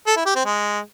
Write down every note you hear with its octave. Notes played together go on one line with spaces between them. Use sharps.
A4
E4
G4
C4
G#3